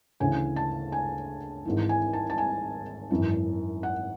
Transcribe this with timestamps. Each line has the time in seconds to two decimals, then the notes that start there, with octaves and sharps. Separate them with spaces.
0.20 D2 C#3 E3 G#5
0.56 A5
0.92 G#5
1.65 G#1 G#2 E3
1.89 G#5
2.13 A5
2.30 A5
2.38 G#5
3.10 G#1 F#2 E3
3.83 F#5